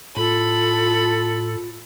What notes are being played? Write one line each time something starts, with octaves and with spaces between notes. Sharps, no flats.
A2 F4 A4 B5